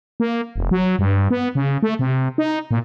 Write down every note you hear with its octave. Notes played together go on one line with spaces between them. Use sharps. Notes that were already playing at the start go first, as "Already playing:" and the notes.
A#3
F1
F#3
G2
B3
C#3
A3
C3
D#4
A#2